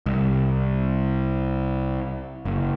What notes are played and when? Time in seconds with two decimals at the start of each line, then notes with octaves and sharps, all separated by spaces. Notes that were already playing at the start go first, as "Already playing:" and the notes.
0.06 C2
2.45 F#1